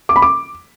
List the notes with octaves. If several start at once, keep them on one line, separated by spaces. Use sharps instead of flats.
D6
B5
D6